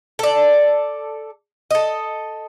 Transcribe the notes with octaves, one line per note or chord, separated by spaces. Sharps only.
A4 D5
A4 D#5